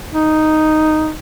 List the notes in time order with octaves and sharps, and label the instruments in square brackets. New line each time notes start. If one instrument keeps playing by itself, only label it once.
[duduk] D#4